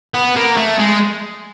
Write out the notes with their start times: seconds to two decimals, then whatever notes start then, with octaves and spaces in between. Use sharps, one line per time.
0.14 B3
0.36 A#3
0.57 A3
0.78 G#3